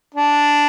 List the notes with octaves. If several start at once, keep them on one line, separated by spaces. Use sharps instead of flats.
D4